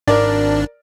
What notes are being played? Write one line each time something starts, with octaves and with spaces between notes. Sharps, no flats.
G#1 D4 A#4 D5